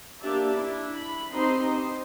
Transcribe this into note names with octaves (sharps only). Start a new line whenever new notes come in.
A#3 D4 G4 D5 E5 A5
D4 E4
B5
C4 D#4 G4 C5 C6
C5